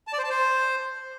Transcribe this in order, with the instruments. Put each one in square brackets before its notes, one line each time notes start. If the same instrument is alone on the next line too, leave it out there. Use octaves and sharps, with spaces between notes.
[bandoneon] A5
D5
C5
A5
C5